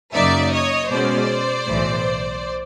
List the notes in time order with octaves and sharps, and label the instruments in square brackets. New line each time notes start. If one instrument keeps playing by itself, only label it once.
[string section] F#2 C#3 F#3 A#3 D#4 D5 E5
C#5 D#5
B2 G#3 C#4 C5 D5
B1 A2 E3